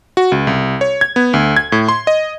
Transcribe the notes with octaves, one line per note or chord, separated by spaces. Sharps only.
F#4
C#2
C2
C#5
G#6
B3
D2
G#6
A2
C6
D#5